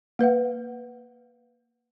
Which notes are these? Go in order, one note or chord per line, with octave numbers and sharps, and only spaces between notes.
A#3 B4 F5 F#5